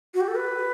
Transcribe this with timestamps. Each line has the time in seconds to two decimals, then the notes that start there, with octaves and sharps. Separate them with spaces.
0.14 F#4
0.21 G4
0.28 A4
0.35 B4